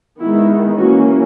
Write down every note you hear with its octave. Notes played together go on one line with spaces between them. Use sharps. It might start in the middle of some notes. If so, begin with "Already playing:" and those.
D#3 G#3 B3 E4
E3 A#3 C#4 F#4